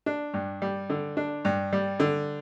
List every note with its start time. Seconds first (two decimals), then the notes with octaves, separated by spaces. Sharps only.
0.06 D4
0.34 G2
0.62 G3
0.90 D3
1.17 D4
1.45 G2
1.73 G3
2.00 D3